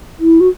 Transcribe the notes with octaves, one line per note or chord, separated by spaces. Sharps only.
E4
F#4